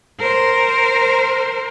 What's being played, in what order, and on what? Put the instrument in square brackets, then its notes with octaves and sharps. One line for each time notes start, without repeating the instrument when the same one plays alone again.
[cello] A#4 C5